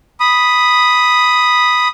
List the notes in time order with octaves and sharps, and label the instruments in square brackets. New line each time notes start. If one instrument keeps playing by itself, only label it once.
[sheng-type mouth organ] B5 D#6